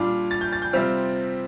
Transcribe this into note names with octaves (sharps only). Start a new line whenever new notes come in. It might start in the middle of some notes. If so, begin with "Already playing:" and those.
Already playing: A#2 G3 D4 F4
A6
G6
A6
G6
C3 G3 C4 F4 F6